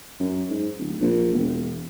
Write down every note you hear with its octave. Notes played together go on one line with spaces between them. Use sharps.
F#2
G#2
D1
A#1
E1